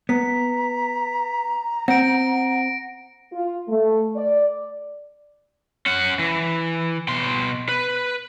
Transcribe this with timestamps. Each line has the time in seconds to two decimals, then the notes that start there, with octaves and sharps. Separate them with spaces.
0.09 B3 A#5 B6
1.88 C4 F#5 A#6 D7
3.32 F4
3.68 A3
4.16 D5
5.86 C#4 F#5
6.19 E3
7.08 B2 C6
7.69 B4